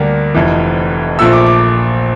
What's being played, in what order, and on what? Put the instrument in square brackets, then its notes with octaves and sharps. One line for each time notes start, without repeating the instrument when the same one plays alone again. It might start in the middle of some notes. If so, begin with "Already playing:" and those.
Already playing: [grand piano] D2 D3 G3 A#3
F1 F2 E3
A#1 A#2 F3 A3 E6
D6
D6